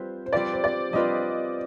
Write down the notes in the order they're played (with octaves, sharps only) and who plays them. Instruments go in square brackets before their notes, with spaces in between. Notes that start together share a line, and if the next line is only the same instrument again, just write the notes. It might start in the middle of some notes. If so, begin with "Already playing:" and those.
Already playing: [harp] G3 C4 F4 B4 [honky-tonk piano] C5
[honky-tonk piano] C5
[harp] G3 C4 F4 B4 [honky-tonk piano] D5
[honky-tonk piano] C5
D5
[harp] G3 C4 F4 B4 [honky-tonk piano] D#5